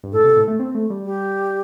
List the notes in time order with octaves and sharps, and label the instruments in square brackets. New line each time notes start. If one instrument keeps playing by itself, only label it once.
[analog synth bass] G2
[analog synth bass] A2 [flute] A4
[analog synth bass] C3
A2
A3
C4
A3
G3
[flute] G4